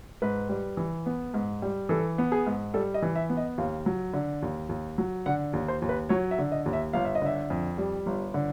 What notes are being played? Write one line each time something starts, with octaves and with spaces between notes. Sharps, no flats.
G#2 B4
G3
E3
B3
G#2
G3
E3 A4
B3
G#4
G#2
G3 A4
D#5
E3
E5
B3
D#5
D#2 F5
F#3
D3
D#2
D#2
F#3
D3 F#5
D#2
C5
D#2
B4
F#3 C#5
E5
D3
D#5
D#2
E5
G1 F5
E5
D#5
D3 E5
F2
G3
G1
D3